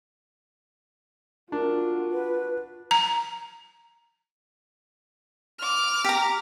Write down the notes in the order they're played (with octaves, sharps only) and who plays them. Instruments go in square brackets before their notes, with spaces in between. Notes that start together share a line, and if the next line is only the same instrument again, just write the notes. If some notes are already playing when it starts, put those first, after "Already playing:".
[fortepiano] D4 [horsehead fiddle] F4 F#4 [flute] A#4
[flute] B4
[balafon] A#5
[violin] D6 F6
[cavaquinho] G4 A#5